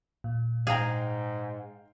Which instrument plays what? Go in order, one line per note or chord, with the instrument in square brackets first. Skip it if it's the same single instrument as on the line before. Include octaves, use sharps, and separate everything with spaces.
[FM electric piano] A#2
[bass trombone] G#2 [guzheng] G#4 A#5 [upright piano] F5 G5